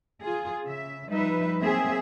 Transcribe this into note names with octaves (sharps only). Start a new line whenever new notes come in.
F4 G#4
C#3 E5
F3 G3 D#4 B4 E5
F#3 A#3 C4 G#4 E5